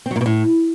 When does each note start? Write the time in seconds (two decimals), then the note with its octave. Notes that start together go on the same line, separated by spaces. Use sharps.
0.06 C4
0.11 F#3
0.16 A#2
0.21 B2
0.26 A2